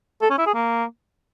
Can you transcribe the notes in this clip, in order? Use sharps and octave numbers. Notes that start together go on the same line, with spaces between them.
A4
C#4
E4
G#4
A#3